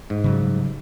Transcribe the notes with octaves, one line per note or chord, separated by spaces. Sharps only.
G#2
C#3 F#3 G3